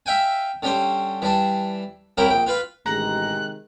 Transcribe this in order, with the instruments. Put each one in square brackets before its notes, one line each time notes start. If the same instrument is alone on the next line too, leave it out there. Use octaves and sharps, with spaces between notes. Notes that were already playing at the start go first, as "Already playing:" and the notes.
[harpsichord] E5 F5 G5 G#5
D3 G3 C#4 G4 C5
E3 G3 D4 A5
C2 F#3 E4 G4 A#4 G5
A#1 G5
F4 B4 F5
[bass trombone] A1 [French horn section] C3 D#3 G#3 [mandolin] A#5 [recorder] F#6